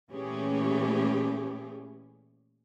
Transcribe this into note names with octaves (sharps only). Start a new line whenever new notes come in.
A#2 E3 A3 C#4 G4 G#4